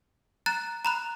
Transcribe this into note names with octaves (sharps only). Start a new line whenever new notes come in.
A#5 F#6 A6
A#5 B5 F#6